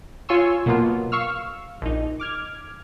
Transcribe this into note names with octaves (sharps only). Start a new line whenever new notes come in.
F4 C#5 G#5 C6 C#6 E6
B2 F#3 A#3 B3 F4
F5 C#6 E6 F6
A#1 D#4
D6 F6 G#6